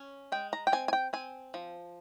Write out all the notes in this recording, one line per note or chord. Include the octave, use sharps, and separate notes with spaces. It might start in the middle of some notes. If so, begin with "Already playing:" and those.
Already playing: C#4
G#3 G5
A#5
G5
C4 G#5
G#5
G5
C4 G#5
F3